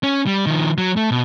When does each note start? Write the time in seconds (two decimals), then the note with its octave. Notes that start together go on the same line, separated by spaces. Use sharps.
0.03 C#4
0.27 G3
0.46 D#3 F3
0.78 F#3
0.96 A3
1.11 B2